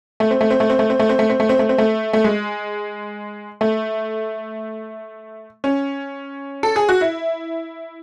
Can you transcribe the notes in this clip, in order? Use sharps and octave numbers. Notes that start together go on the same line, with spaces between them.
A3
C4
A3
C4
A3
C4
A3
C4
A3
C4
A3
C4
A3
C4
A3
C4
A3
A3
G#3
A3
C#4
A4
G#4
F#4
E4